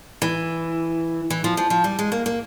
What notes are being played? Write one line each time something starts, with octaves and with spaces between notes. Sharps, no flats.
E3
E3
F3
F3
F3
G3
G#3
A#3
A#3